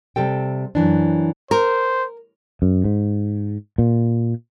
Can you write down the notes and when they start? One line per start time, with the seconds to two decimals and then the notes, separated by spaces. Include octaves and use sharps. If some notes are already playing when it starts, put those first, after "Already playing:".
0.16 C3 G3 A4 G5
0.75 F#2 E3 D4
1.51 A#4 C5
2.62 F#2
2.84 G#2
3.78 A#2